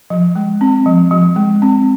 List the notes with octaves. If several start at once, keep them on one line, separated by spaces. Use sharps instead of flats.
F3
G#3
C4
F3
F3
G#3
C4